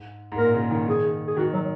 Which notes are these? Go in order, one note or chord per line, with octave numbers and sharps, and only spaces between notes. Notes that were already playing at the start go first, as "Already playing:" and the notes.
Already playing: G#2
G#2
A#2 A#4
C#3
D#3
D#3 G#4
G#4
D#3 F#4
F#3